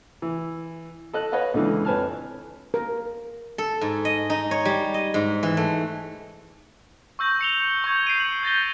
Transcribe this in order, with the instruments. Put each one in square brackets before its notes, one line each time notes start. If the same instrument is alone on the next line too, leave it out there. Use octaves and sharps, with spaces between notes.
[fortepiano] E3
A4 D#5 F#6
B4 C#5 D#5 F5 F#5
C#2 D3 E3
F2 B4 C#5 G#5 A5 F6
[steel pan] A#4
[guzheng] A4
G#2
D#5
D#4
C#5
G3
D#5
G#2
E3
A3
[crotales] C#6 E6 G6 A#6
C#7 F7 G7
C#6 G6 G#6
G6 C7 D7 D#7
F#7
G6 A6 A#6 G7